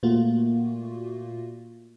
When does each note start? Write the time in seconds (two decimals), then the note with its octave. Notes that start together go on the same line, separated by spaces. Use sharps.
0.03 A#2 A3 A#3 F4 F#4